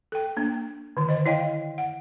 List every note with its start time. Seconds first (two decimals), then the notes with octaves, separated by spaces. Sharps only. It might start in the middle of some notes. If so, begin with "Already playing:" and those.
0.12 A4 G5
0.37 A#3 D4
0.97 D3 D#3
1.09 C5 D#5
1.26 E4 C#5 D#5 F5 G5
1.78 F#5